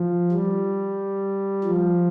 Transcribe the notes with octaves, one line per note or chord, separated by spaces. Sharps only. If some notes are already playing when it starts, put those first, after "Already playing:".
Already playing: F3
G3
F3